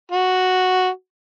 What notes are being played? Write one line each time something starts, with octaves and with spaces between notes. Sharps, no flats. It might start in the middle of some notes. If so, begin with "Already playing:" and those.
F#4